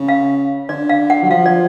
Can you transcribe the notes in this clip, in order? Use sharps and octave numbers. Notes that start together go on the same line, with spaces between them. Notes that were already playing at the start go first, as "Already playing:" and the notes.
Already playing: C#3
F5
D3 D5
F5
F#5
F#3
F3 F5
D5